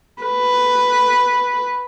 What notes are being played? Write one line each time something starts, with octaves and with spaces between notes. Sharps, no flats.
B4